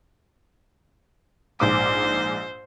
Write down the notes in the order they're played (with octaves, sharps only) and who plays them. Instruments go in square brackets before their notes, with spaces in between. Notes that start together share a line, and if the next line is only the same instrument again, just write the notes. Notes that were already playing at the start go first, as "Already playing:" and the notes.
[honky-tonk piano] A#1 G#2 D6 [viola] C5